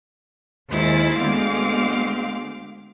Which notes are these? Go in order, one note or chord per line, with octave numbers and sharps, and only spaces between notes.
D#2 D#3 G#3 E4 C5 A6
D2 G#3 B3 C4 F5 D6